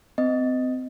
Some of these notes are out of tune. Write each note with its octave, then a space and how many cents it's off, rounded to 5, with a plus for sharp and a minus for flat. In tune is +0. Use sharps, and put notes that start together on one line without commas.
C4 -35 D#5 +0